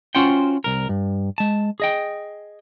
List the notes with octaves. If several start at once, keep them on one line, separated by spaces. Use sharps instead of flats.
C#4 F4 F#4 C5 F#5 G5
C2 A#4
G2
G#3 A5
G#4 D#5 G5